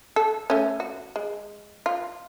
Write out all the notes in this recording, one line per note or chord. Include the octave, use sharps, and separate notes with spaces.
A4
A3 C#4
F#4
G#3
F4